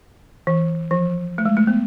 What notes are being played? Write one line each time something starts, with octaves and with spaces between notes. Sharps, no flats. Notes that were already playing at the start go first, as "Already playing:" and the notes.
E3
F3
A3
G#3
A3
B3